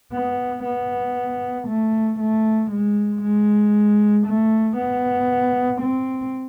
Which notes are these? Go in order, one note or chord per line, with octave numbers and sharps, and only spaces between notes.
B3
B3
A3
A3
G#3
G#3
A3
B3
C4